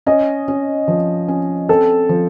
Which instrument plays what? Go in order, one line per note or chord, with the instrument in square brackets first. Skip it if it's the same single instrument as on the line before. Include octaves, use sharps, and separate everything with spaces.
[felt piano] C#4 [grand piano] D#5
[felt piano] C#4
F3
C#4
[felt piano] C4 [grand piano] A4
[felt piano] F3